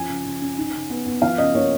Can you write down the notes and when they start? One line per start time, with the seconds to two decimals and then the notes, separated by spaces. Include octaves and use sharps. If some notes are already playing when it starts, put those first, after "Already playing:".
Already playing: F3 C#4 G#5
0.09 C#3
0.25 C#3
0.41 C#4
0.58 D#4
0.74 C#3
0.90 B3
1.06 B3
1.22 F3 F5
1.38 C#3 D#5
1.55 A#3 C#5